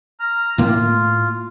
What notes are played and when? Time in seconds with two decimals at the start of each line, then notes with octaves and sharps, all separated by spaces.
0.20 A#5 F6
0.58 A2 A#3 F4